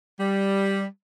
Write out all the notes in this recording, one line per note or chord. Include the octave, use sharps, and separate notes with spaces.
G3